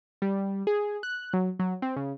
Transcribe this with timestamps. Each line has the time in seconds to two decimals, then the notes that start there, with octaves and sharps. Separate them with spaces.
0.22 G3
0.67 G#4
1.03 F#6
1.34 F#3
1.59 F#3
1.82 C4
1.96 C#3